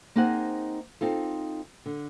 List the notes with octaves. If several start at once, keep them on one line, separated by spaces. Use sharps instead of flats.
A#3 C4 D#4 G#4 C5 F#5
C4 D#4 F4 A4
D3